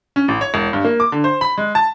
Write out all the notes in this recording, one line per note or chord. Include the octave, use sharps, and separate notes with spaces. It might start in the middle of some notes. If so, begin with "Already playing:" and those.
C#4
A1
C#5
E1
G2
A#3
D6
D3
C5
B5
G#3
A5